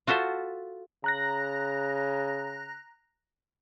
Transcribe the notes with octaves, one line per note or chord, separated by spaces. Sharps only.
F4 F#4 A4 C5 E5
C#3 A#5 F#6 A#6